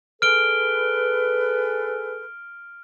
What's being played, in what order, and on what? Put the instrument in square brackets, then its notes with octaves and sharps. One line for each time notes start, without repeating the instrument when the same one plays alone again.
[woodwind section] G#4 A4 B4 [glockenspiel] F6 D7 G7